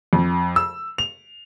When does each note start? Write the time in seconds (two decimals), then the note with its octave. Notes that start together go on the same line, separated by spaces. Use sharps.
0.13 F2
0.56 E6
0.98 F7